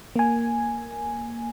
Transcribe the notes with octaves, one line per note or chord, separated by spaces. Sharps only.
A#3 G#5